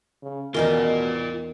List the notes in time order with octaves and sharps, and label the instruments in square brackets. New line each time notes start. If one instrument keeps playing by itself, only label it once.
[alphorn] C#3
[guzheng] E2 D#3 D#4 [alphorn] B2 [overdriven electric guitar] F4 D5 [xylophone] A#4